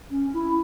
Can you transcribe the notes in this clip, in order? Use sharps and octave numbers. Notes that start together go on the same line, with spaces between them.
C#4
E4